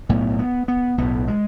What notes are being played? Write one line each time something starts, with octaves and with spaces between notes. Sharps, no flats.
B1 A2 B3
B3
B3
B1 A2 B3
G#3